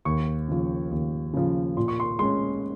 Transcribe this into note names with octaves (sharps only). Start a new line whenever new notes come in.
D#2 C#6
C#3 F3
D#2
C#3 F3
A#2 C6
C#6
C6
G#3 C#4 C6